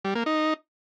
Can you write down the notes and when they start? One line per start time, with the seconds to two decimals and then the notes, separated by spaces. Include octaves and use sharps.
0.05 G3
0.15 A#3
0.26 D#4